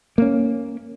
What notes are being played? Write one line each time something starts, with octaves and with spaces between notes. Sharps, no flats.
A#3 C#4